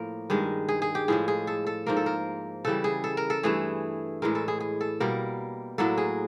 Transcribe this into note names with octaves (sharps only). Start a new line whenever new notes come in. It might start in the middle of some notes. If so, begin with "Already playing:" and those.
Already playing: A2 F3 A#3 A#4
G2 D#3 G#3
G#4
G#4
G4
A2 F3 G#3 G#4
G#4
A4
A4
G#2 F3 A#3 A#4
A4
A#4
C#3 E3 G3 A4
G#4
A4
A#4
A4
G2 E3 A3 G#4
A2 E3 G#3 A#4
A4
G#4
G#4
A4
B2 G3 A#3 A#4
A2 F#3 A#3 A4
G#4